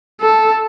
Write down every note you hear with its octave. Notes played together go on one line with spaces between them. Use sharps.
A4